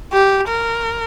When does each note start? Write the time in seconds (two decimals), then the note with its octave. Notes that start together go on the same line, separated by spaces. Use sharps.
0.12 G4
0.48 A#4